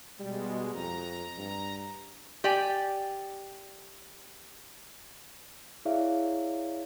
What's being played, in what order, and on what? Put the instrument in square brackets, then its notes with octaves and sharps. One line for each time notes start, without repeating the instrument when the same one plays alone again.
[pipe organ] B2 G#3 [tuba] G3
[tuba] F2 [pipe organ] A#5
[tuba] G2
[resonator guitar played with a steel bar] G4 D5 G5 G#5
[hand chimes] E4 G#4 C#5 D5 E5 F5